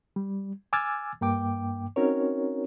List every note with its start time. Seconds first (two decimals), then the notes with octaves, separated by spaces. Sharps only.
0.16 G3
0.73 G#5 D6 E6 F6 G#6 A6
1.21 G2 A#3 G5 D6
1.96 C4 C#4 D#4 F#4 A#4 C#5